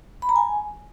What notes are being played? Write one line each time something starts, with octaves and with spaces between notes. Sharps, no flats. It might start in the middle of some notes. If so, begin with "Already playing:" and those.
B5
A#5
G#5